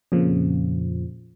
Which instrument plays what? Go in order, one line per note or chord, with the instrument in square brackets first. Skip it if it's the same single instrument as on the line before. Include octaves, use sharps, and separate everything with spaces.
[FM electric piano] F2 A#2 C#3 F3